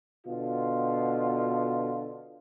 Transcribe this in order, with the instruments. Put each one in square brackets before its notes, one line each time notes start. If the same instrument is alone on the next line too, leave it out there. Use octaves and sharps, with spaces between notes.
[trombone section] B2 D3 F4